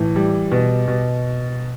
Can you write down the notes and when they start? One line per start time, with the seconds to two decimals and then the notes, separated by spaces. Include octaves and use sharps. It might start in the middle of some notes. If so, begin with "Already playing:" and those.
Already playing: A2 E3
0.16 G3
0.52 B2
0.88 B2